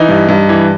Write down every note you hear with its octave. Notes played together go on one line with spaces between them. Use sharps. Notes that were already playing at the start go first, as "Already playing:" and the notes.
Already playing: E3 D#4
G2
G2
E3